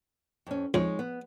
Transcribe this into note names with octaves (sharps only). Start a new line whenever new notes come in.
F2 C#4
F2 G#3 D#4 C#5
B3